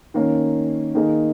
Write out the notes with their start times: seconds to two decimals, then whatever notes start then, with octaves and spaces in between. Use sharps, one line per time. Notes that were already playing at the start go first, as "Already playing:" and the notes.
0.14 D#3 A#3 C#4
0.94 D#3 A#3 D#4 G#4